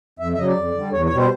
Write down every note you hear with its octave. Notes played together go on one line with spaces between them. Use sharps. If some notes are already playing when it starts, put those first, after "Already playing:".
F2 E5
E5
C#3 F#3 D#5
D5
F2
D3 G3
E2 C#5
C#5
B2 G3
C5